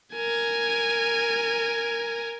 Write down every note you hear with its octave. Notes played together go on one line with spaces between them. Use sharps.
A#4 G#5